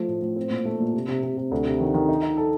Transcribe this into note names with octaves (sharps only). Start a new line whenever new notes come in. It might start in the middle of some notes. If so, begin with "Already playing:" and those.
Already playing: F3 A3
A2
A2
C4
A#2
A3
A#2
C3
C3
C3
C3
D2
C3
D#3
D#3
D#4
D#4
A4